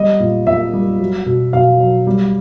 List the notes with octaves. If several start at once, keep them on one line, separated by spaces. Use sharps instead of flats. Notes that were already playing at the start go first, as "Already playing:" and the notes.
Already playing: G3 D#5
A#2
A#2 E5
G3
F#3
B2
B2 F5
F#3
G3